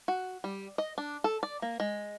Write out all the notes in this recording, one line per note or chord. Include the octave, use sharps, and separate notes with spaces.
F#4
G3
D#5
D4
A4
D5
A#3
G#3